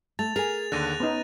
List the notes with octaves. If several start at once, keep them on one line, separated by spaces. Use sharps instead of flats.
A3 A5 A6 F7
G#4 A#4 G#5 F7
D#2 D3 F#6 A#6 D#7
B3 C#4 D#4